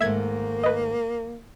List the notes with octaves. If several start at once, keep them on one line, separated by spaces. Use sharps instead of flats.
G#2 D#3 A3 A#3 E5 G#6
B4 D#5